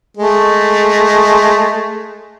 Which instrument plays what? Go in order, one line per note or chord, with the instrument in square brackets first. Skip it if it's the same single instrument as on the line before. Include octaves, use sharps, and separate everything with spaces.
[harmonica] G#3 A3